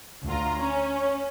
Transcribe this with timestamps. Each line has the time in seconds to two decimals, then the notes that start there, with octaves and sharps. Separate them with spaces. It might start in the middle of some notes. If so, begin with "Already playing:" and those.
0.25 D2 F4 A#5
0.57 C#4